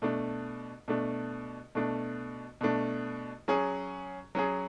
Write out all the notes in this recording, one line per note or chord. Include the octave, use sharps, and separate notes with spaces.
B2 A3 D4
B2 A3 D4
B2 A3 D4
B2 A3 D4
F#3 C#4 G#4
F#3 C#4 G#4